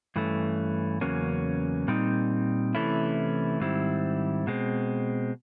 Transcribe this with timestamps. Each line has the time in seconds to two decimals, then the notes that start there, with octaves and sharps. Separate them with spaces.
0.16 G2 E3 A3 C#4
1.01 E2 C#3 F#3 A#3 C#4
1.88 A#2 G3 C4 D#4
2.75 C3 E3 A3 C#4 E4
3.60 G#2 D#3 G3 C4 E4
4.47 B2 G#3 C4